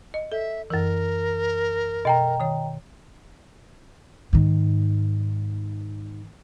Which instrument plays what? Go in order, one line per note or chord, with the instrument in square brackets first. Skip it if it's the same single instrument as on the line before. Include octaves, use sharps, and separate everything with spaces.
[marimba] D#5
[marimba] A4 [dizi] E5
[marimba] F#2 E3 [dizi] A#4
[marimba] B2 [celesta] D#5 G5 A#5
[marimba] D#3 C#5
[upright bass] G#2 D#3